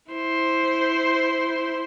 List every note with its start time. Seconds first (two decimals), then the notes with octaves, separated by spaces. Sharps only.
0.12 E4 C5